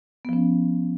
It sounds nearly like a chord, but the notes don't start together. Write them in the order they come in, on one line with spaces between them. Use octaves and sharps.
B3 F3 C#4